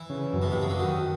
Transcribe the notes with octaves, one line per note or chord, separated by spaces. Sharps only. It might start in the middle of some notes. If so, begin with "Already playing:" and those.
Already playing: E3
C#3
F#2
B2
C3
F#2
C#3
D3
D#3 F#4